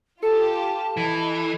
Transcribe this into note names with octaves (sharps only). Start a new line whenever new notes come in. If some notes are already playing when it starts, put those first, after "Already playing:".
F4 G4 A4 A5
E3 D#5